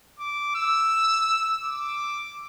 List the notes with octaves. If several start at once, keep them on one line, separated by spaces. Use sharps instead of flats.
D6
E6
D6